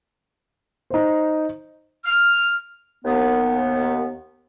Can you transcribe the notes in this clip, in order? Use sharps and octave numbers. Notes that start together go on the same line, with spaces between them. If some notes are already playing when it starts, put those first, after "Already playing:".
D#4 C5
F6
D#2 B3